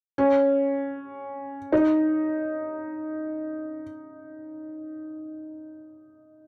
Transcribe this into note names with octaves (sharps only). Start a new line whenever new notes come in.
C#4
D#4